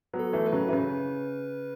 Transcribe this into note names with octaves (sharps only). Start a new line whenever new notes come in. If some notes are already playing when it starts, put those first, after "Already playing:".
F#3 B3
A4
E3 A3
B4
C#3 F#3
E3
C#3 B4